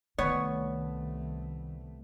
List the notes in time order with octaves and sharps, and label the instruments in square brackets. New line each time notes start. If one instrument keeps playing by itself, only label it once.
[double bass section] C2 A3 [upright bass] D#3 [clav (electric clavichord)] B3 [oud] C#5